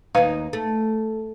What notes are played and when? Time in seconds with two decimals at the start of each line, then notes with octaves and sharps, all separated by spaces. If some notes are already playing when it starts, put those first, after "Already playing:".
0.15 D#2 D#4 B4 F5
0.53 A3